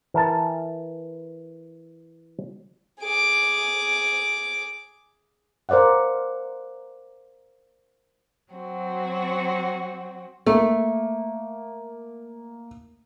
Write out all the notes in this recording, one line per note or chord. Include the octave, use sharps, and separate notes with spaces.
E3 A#4 A5
G#4 D6
A#4 C5 D5 F5 F#5
F#3 C4 F#4
A3 A#3